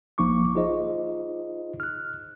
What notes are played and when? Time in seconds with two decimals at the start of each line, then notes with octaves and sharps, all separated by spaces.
0.18 A#1 F3 A#3 D#4 C#6 D6
0.55 D#4 F4 G#4 C5 D#5
1.80 F6 F#6